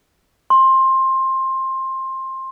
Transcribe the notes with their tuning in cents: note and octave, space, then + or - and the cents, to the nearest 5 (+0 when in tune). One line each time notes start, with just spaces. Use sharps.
C6 +20